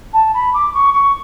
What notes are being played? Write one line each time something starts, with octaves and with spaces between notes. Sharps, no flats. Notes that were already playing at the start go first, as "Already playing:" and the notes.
A5
B5
D6
C#6
C#6